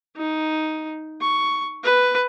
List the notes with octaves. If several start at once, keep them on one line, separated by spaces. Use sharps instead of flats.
D#4
C#6
B4